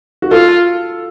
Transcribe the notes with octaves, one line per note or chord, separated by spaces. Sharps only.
F#4
F4 A4